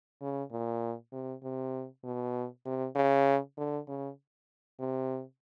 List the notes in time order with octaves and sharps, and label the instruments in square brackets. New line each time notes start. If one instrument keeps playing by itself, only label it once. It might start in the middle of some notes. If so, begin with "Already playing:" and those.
[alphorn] C#3
A#2
C3
C3
B2
C3
C#3
D3
C#3
C3